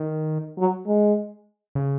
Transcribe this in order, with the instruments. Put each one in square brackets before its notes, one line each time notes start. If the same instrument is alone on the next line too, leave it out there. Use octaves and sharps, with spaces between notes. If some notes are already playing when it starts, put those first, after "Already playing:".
Already playing: [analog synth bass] D#3
[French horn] F#3
G#3
[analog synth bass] C#3